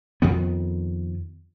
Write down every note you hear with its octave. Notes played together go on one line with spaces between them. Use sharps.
F2 D#3 B3